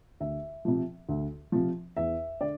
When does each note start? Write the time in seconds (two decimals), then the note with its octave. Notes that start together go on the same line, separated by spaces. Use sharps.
0.20 D2 E5
0.65 C3 F3
1.09 D2
1.52 C3 F3
1.97 E2 E5
2.41 D3 D5